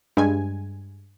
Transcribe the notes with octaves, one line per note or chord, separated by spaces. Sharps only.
G2 G#3 G#5